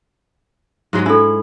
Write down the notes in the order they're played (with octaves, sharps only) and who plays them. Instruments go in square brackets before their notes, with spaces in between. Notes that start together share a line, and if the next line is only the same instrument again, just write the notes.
[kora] G#2 F#3 G#3
[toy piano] D4 A4 [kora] E4